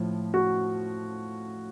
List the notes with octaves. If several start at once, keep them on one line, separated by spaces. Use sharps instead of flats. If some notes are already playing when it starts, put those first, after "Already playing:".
Already playing: A2 F3
F#4